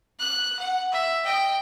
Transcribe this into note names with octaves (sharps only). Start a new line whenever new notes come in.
F#6
F#5
E5
D#5 G5